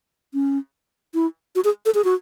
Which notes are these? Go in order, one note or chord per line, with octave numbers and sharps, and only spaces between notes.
C#4
E4
F#4
G#4
A4
G#4
F#4